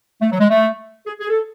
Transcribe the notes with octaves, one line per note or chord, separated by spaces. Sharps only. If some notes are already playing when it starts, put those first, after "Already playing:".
A3
F#3
G#3
A3
G#4
G#4
A4